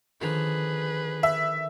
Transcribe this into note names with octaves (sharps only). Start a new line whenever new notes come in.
D3 D#3 F3 G#4 B4
E5